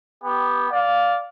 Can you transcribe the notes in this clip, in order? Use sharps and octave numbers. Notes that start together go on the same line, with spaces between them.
B3 G4
D5 F5